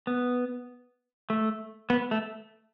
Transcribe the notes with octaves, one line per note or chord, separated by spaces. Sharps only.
B3
A3
B3
A3